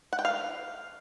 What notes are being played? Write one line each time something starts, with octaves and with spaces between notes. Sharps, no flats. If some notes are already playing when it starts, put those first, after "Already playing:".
F#5
G5
F5